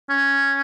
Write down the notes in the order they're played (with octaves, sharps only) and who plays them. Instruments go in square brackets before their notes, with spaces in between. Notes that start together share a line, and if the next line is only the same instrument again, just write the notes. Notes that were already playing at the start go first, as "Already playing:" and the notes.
[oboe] C#4